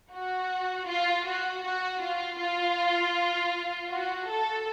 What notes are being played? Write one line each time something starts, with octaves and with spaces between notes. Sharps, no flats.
F#4
F4
F#4
F#4
F4
F4
F#4
A4